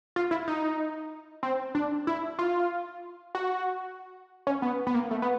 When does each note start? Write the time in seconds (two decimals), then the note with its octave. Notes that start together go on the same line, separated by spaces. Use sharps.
0.16 F4
0.31 E4
0.48 D#4
1.43 C4
1.75 D4
2.07 E4
2.39 F4
3.35 F#4
4.47 C#4
4.62 B3
4.87 B3
4.95 A#3
5.11 A3
5.22 B3